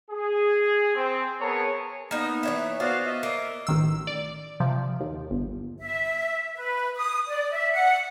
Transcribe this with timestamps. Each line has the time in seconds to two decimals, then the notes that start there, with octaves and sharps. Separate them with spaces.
0.11 G#4
0.95 C4
1.41 B3 G#4 A#4 C#5 A5
2.11 A#3 B3 D#4
2.43 E3 C#5 E5
2.80 B3 F4 F#4 C5 D5 F5
3.06 D#5 E5
3.23 A#3
3.67 A1 D#3 E6
4.07 D5
4.60 C3 F3
5.00 D#2
5.31 G1
5.80 E5
6.54 B4
6.96 D#6
7.28 D5
7.51 E5
7.72 F#5